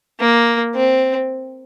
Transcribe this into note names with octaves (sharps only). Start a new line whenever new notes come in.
A#3
C4